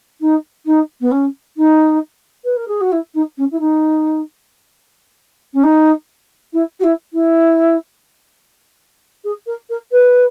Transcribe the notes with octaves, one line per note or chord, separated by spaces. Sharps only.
D#4
D#4
B3
C#4
D#4
B4
A#4
G#4
F#4
E4
D#4
C#4
E4
D#4
C#4
D#4
E4
F#4
E4
E4
G#4
A#4
A#4
B4